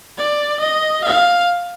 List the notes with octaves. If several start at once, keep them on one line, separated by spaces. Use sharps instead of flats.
D5
D#5
F5